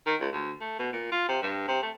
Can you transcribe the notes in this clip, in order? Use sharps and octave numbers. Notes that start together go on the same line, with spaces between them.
D#3
C#2
D2
A3
B2
A#2
F4
C3
G2
C3
A3